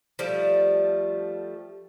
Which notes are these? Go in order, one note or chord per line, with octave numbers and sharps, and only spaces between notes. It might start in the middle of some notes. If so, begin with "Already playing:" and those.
F3 G3 A3